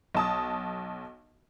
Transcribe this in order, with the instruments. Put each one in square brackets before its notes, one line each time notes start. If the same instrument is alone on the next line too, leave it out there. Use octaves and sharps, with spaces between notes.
[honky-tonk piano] B1 A5 D#6